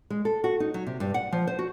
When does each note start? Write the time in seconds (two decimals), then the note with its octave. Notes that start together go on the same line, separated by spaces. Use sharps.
0.10 G#3
0.25 A4
0.44 F#4
0.60 D#4
0.74 F#3
0.87 C3
1.00 G2
1.14 F#5
1.32 F3
1.47 C5
1.59 F#4